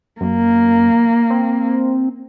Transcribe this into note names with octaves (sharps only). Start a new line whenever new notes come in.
F#2 A#3
C4